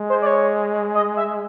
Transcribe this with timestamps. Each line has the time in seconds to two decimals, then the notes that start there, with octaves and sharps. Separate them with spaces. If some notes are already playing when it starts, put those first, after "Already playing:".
Already playing: G#3
0.10 C5
0.22 D5
0.27 C#5
0.95 D#5
1.17 E5